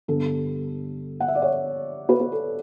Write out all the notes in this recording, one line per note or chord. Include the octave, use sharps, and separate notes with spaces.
G2 D3 G3 B3 D4 A4
F#5
E5
D5
C#5
B4
B4
A4